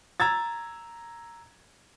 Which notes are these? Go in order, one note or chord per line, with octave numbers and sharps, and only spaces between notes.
A#5 E6 G#6 A6